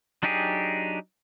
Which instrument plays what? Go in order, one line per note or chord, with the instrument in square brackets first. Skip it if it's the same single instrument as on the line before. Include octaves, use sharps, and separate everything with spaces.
[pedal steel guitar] F#3 D4 D#4 G4 G#4